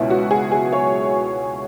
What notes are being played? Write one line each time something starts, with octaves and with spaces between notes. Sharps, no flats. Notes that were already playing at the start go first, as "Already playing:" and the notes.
Already playing: C#2 B2 F#3 E4
F#4
G#4
G#4
C#5